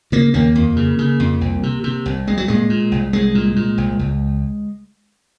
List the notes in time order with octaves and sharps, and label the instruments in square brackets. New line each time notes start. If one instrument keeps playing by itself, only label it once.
[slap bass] C#3 A#3
D#2 A#3
F2
C#3
C#3
F2
C2
C3
C3
C2
C2 G#3
F#3
A#2 G#3
A#2
C2
C2 G#3
A#2
A#2
C2
C#2